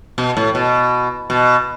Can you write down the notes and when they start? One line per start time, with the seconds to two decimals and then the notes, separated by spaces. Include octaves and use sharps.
0.18 B2
0.37 A2
0.55 B2
1.30 B2